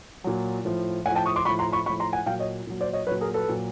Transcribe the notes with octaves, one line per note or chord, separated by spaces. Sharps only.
A#2 F#3
A2 F3
A2 F3 F#5 G#5
G5 A5
C#6 D#6
C6 D6
A2 F3 B5 C#6
A#5 C6
B5 C#6
A2 F3 B5 C#6
A#5 C6
F#5 G#5
A#2 F#3 F5 G5
C#5 D#5
A#2 F#3
C5 D5
C#5 D#5
A#2 F#3 B4 C#5
G#4 A#4
A4 B4
A#2 F#3